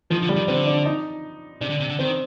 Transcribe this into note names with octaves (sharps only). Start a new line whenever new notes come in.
D#3 F3
D3
G3
D#3
D3 C4
D4
D#4
C3 D4
D3
C3
D3
D#3 C4